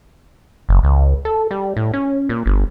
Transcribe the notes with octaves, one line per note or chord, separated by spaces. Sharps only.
F#1
C#2
A4
G3
A2
C#4
A#2
G1